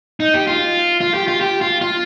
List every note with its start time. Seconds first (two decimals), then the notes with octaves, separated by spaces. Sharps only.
0.20 D#4
0.34 G4
0.47 F4
1.01 F4
1.14 G4
1.28 F4
1.41 G4
1.61 F4
1.81 F4